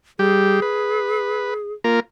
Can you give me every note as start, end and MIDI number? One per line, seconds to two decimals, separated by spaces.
0.19 0.60 55
0.19 0.60 67
0.19 1.73 68
0.62 1.54 71
1.84 2.00 58
1.84 2.00 65
1.84 2.00 70